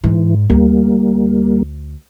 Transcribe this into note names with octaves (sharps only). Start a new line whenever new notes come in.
G#2 E3
D2 G3 A#3